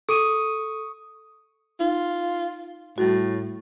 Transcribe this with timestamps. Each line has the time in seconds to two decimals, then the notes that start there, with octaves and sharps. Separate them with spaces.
0.09 A4 C#6 D#6 D#7
1.80 D#4 F4
2.98 A2 G3 F#4